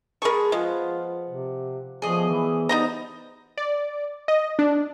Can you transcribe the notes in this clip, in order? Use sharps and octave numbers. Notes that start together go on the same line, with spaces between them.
G#3 G#4 A#4 A5 B5 C#6
F3 G#3 B3 F4 F#5
C3
B2 F3 A3 G#4 D5 D#5
E3 E4
G3 B3 D#4 A#4 C5 D#5 A#5
D5
D#5
D4